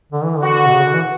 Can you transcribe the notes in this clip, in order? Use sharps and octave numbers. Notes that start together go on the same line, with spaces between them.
D3
E3
D3
F#4
B2
C#3
D3
E3